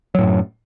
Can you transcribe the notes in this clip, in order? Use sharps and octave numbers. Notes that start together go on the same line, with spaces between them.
F#2 A2 F#3